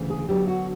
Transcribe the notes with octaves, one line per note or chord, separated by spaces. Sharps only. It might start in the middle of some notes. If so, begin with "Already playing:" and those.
Already playing: D2 C#3 E3
G#4
D3 F#3 B3 D4 G4
F#4